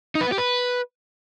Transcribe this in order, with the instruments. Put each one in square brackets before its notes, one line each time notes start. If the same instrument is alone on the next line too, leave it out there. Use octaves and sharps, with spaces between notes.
[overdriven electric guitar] D#4
B4
B3
G4
B4